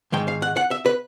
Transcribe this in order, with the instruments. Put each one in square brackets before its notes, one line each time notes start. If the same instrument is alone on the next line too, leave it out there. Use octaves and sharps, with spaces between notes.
[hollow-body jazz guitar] G#2 D#3 G#3 G5
F5
F#5
F#5
E5
B4